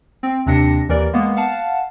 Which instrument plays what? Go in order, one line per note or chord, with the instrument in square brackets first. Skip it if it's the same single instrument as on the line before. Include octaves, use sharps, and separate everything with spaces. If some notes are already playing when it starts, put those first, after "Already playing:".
[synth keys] C4
D#2 C3 C4 D4 A#6 C#7
D#2 E3 A#4 D5
G#3 A#3 B3
F5 F#5 A5